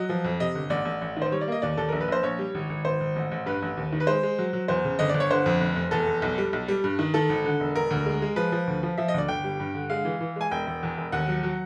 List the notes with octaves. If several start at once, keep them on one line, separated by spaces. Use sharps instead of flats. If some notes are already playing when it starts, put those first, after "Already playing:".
Already playing: F#3 D#5
F3
F2
C3 D#5
G1
A1 D5
A1
A1
D#3
C5
G3 C#5
D5
A#3 D#5
D#2 D5
D#2 A4
A#1 A#4
B4
A#1 C5
A#1 C#5
G3
G#1
G#1
G#1 C5
G#1
A1
A1
G2 B4
A1
D#2
D#3
B4
G#3 C5
G#3
F#3
F#3
E2 C5
C#3
G1 D#5
G1 D5
C#5
D3 C5
F2
F1
F1
E2 A4
F1
B1
G3
B1
G3
G2
D#3
D#3 A4
G#1
D3
E1
E1 A#4
D2
G#3
G#3
F3 B4
F3
D2
F3
F3 E5
D#5
D2 D5
G1 G5
G3
G2
D3
G#3 F5
E3
E3
G#3 G#5
E1 G5
E1
E2
E1
D#2 F#5
F#3
F#3